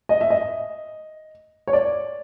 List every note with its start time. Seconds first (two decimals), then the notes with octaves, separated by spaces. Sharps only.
0.09 D#5
0.21 E5
0.30 D#5
1.67 C#5
1.73 D5